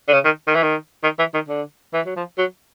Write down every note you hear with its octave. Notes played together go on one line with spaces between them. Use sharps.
D3
C#3
D#3
D#3
E3
D#3
D#3
E3
D#3
D3
E3
F#3
F3
F#3